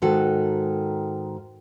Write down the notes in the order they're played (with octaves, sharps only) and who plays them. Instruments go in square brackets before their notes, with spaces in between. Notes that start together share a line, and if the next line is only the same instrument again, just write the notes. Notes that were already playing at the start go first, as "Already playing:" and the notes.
[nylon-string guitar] G#2 D#3 F#4 A4